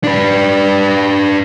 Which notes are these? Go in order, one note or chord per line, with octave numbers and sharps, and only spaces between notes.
D4 B4